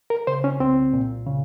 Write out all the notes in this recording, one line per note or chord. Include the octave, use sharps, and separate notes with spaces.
A#4
C#3 C5
C#4
C2 C4
A#2
C#3